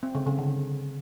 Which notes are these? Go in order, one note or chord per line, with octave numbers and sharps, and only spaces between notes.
C4
C#3
C#3
D3